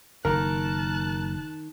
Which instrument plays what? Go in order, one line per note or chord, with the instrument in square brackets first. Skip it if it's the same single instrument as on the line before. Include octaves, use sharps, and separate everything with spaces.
[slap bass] F#1 [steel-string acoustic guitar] D#3 [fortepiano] A#4 [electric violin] A5 F#6